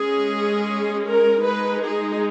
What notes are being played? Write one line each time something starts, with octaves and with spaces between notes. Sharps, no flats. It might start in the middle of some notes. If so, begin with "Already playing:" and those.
Already playing: G#3 C#4 G#4
A#4
G#3 D#4 B4
G#4